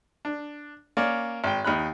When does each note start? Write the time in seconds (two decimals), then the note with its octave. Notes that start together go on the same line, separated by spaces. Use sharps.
0.25 D4
0.97 A#3 C#4 C#5 D5
1.44 G#1 G5
1.65 D#2 D#4 B5 F#6